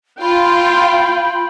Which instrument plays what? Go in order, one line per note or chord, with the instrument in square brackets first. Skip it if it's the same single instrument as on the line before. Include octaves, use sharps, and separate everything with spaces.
[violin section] F4 [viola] G5 [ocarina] B5